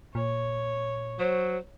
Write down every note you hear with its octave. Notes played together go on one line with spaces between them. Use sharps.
A#2 C#5
F#3 C5